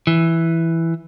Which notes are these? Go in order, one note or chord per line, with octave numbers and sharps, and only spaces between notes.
E3